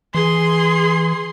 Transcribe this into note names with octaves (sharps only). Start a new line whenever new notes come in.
E3 G#4 C6